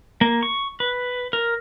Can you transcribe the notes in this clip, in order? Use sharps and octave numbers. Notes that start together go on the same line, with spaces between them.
A#3
C#6
B4
A#4